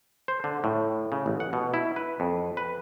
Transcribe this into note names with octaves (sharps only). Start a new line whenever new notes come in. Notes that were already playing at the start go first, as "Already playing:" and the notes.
C5
D3
A2
C#3
A1
F#5
B2
E4
B4
F2
B4